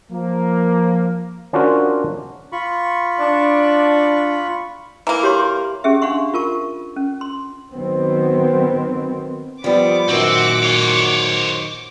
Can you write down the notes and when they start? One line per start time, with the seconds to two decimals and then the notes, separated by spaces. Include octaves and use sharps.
0.11 F3 A#3
1.53 C#4 D4 F4 F#4 A#4 C5
2.52 F4 B5 C#6
3.20 D4
5.07 E3 A#3 A#5
5.23 G4 C#5 C6
5.84 C#4 G4 G#4 E5
6.02 D4 F5 F#5 C6 C#6
6.34 F4 A#4 A5 C#6
6.96 C#4
7.21 C6
7.72 D#3 F#3 B3 C4
9.64 F3 G3 B3 D6
10.09 F#2 A#2 D#3 C4 F#4 F#5
10.63 C5 C#5